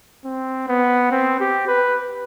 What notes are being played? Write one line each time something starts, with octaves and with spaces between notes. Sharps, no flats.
C4
B3
C4
G4
B4